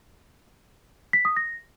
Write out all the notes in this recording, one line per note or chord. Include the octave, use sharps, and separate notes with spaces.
B6
D#6
A#6